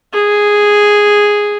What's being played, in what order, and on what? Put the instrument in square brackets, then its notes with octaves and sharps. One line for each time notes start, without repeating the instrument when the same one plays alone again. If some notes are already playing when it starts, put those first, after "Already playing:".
[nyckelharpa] G#4